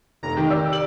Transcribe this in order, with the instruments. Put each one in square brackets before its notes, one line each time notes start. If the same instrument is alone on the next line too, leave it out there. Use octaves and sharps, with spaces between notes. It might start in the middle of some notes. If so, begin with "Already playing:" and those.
[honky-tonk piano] F1 [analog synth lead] A#5
[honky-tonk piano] D#3 [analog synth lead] G4
[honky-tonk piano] D5 E6
[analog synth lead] D5 [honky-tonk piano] F#7